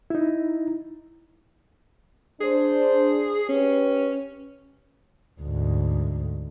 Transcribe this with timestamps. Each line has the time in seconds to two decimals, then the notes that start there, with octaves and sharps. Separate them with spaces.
0.10 D#4 E4
2.41 D4 G#4 C5
3.49 C#4 G4 B4
5.41 D2 G#2